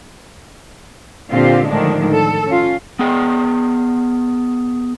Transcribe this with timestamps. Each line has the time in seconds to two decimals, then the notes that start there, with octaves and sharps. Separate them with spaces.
1.31 A#2 D3 C4 F4 G4
1.67 A2 D3 D#3 F3 G#3 D4
2.11 A4
2.46 C#4 F4
2.99 B3 G#4 G5